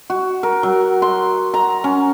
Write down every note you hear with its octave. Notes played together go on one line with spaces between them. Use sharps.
F#4
A#4
F#3
C6
A#5
C#4